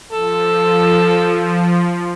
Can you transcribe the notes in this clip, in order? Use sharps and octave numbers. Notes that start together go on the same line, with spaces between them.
F3 A4